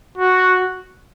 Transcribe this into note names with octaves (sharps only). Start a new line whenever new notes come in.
F#4